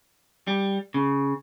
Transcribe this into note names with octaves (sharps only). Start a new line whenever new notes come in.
G3
C#3